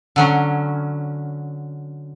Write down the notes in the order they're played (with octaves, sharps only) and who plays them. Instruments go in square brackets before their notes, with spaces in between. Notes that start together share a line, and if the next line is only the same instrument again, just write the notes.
[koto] D3 F#3 C#4